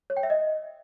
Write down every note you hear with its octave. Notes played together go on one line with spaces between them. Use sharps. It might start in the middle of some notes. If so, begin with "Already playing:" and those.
C#5
G5
E5
D#5